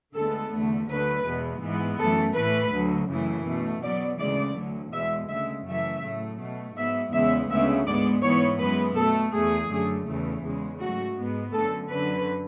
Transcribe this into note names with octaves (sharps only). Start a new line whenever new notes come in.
D2 D3 G#3 B3 A4
E2 D3 A3
D2 D3 F#3 A3 B4
E2 B2 G#3 B3
G#2 E3 G#3 B3
F#2 E3 A3 A4
A2 E3 A3 B4
D2 D3 F#3
F#2 C#3 E3 A3
B2 A3
B2 F#3 B3 D5
D2 C#3 E3 G#3 D5
D2 D3 F#3
E2 B2 G#3 E5
D2 C#3 G#3 E5
F#2 C#3 E3 A3 E5
A2 F#3 A3
B2 A3
G#2 F#3 B3 E5
E2 C#3 G#3 B3 E5
D2 C#3 G#3 B3 E5
G#2 G#3 B3 D5
G#2 E3 B3 C#5
F#2 E3 G#3 B3 B4
B2 A3 A4
E2 B2 A3 G#4
F#2 D3 A3
E2 C#3 E3 A3
E2 C#3 G#3
G#2 F#3 A3 F#4
G#2 G#3 B3
F#2 D3 A3 A4
F#2 D3 F#3 B4